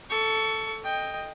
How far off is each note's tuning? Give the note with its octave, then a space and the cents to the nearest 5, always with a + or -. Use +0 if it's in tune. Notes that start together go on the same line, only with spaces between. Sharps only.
A4 +0 C#6 +20
D#5 +0 G5 +10